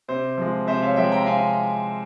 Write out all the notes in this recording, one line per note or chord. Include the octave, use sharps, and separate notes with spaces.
C3 C5
F3 G#3
C3 C5 E5
C#5 F5
F3 G#3 E5 G5
G5 A#5
C3 F5 G#5